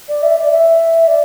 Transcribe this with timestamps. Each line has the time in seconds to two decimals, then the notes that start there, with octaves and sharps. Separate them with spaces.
0.09 D5
0.23 E5
0.36 D5
0.51 E5
1.08 D5